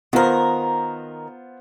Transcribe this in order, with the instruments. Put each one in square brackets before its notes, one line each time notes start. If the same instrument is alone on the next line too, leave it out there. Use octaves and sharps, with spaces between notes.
[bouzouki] D#3 A#4 [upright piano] B3 F4 C5